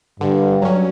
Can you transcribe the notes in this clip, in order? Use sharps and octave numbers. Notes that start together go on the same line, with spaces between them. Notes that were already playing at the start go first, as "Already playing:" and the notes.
G2 D3
F#3 C#4